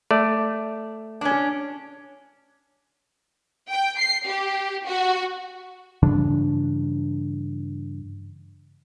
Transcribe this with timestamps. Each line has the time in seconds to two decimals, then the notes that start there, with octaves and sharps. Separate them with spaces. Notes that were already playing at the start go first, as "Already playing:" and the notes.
0.11 A3 D5
1.21 C#4 D4
3.69 G5
3.99 C7
4.27 G4
4.86 F#4
6.02 G2 C#3 E3 D4